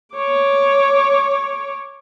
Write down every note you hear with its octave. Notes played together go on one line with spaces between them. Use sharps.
C#5 D6